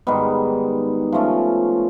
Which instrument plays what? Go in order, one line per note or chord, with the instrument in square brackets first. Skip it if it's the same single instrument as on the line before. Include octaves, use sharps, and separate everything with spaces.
[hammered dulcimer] G#2 D#3 G3 B3
F3 A3 C#4